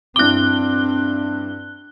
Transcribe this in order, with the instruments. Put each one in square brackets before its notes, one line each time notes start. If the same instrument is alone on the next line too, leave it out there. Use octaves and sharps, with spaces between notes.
[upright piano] G2 E4 D6 [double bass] C4 [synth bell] F#6 G7